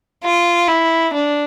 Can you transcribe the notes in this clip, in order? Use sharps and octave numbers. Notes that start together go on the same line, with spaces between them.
F4
E4
D4